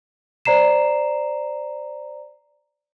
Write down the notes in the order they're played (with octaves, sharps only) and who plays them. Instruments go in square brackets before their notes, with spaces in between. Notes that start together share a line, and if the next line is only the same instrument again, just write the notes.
[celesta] C5 D5 A#5 C7 E7